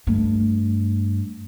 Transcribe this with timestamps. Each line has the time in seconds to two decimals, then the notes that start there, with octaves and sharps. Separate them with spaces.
0.07 G2 A3